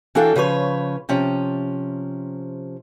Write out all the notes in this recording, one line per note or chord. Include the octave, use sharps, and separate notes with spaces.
E3 D4 F#4 A4 F5 G5
C#3 F3 B4 C#5
C3 F3 C#4